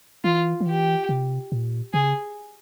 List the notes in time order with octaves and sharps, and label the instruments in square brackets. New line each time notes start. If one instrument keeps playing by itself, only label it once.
[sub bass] E3 [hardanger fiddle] F4
[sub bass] F3
[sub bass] E3 [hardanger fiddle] G4
[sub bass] C3
A#2
[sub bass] C#3 [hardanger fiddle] G#4